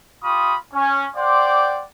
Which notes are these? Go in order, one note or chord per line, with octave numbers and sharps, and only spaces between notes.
F4 G4 B5 C#6 D#6
C#4
C5 D5 F#5 G5 C6 D6